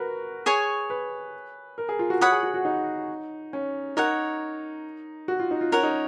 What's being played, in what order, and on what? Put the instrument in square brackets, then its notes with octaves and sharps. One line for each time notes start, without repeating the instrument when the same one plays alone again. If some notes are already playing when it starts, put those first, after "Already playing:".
Already playing: [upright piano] F#4 A#4 B4
[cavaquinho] G#4 C#5 G#5 C#6
[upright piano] B4
A#4
G#4
F4
F#4
[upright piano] F#4 [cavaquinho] C#5 F#5 B5 D#6
[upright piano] G#4
F#4
F#4
D#4
C#4
[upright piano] D#4 [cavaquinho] A#4 C#5 F#5
[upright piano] F#4
F4
D#4
F4
[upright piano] C#4 [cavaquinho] A#4 C#5 F#5
[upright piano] D#4